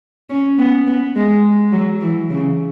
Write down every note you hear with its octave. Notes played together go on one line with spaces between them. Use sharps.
C#4
B3
B3
G#3
F#3
E3
C#3